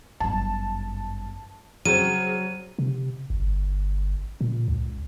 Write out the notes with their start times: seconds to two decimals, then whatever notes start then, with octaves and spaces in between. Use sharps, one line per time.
0.20 G1 F#2 A5
1.85 C#3 F#3 C4 D#7
2.79 C3
3.30 G1
4.41 A#2
4.68 C#2